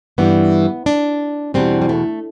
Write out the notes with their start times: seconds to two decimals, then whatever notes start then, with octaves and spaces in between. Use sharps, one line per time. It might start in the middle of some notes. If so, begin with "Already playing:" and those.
0.18 G2 E3 G3 B3
0.86 D4
1.54 E2 B2 G3 C4
1.82 G3
1.89 A3